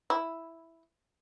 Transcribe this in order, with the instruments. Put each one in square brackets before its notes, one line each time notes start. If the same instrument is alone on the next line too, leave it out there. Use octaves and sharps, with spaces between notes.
[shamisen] E4